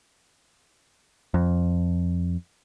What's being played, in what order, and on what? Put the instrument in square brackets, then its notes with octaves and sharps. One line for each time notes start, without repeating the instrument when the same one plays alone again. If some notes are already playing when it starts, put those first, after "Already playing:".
[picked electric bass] F2